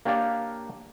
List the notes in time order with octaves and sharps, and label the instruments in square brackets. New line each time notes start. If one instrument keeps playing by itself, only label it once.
[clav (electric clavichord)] A#3 D4 G4 C#5 D5 F5